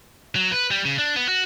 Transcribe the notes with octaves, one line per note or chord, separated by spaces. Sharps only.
F#3
B4
G3
C#3
D4
B3
F#4